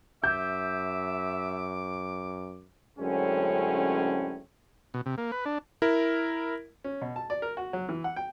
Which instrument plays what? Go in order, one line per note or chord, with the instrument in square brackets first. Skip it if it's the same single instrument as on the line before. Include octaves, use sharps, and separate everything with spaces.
[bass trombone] F#2 [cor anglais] E5 [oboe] D6 [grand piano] G6
[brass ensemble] F#2 A2 D3 G#3 C4 C#4
[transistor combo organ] B2
C3
A#3
B4
D4
[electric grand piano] E4 A#4
[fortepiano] C#4
B2
A5
D5
A#4
F#4
F#3
E3
F#5
G5